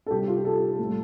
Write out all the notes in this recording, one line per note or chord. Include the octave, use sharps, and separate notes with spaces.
A4
C2 C3 G3 G4
F4
G4
A4
A2 G3